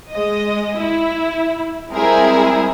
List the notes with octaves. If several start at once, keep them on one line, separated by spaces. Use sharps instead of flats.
G#3 D#5
E4
G3 G#3 C4 E4 G#4 A#4